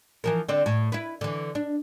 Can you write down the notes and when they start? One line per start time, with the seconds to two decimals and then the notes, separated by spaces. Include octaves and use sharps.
0.24 E3 F3 A#4
0.49 D3 C4 D5
0.66 A2
0.92 E4 B4
1.21 D3 E3
1.55 D4